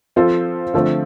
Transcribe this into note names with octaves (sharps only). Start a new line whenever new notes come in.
F3 C4 F4 A4 C5
D3 F3 A3 C4